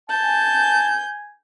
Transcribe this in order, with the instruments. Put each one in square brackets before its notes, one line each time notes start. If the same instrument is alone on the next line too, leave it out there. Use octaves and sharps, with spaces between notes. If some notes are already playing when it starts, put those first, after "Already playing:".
[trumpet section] G#5 [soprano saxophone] A5 [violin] G6